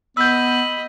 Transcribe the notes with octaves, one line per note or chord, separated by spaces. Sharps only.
B3 D#5 B5 E6 G6